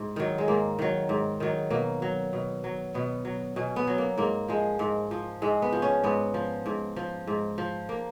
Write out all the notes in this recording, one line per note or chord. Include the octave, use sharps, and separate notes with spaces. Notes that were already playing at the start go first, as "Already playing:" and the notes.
Already playing: G#2
D#3 F#3
G#3
G#2 A#3
D#3 F#3
G#2
D#3 F#3
B2 A#3
F#3
B2
F#3
B2 B3
F#3
B2 C#4
B3
F#3
A#3
G#2 A#3
F3 G#3
G#2
F3
G#2 G#3
B3
F3
C#4
G#2 B3
F3
G#2
F3
G#2
F3
A#3